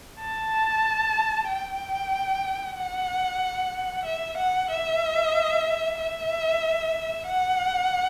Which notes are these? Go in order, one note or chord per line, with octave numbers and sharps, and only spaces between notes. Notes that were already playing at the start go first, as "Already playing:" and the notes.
A5
G5
F#5
E5
F#5
E5
E5
F#5